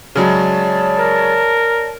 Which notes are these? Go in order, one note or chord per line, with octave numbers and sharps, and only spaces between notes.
C#3 F#3 G#3 C#5 D5 A5
A#4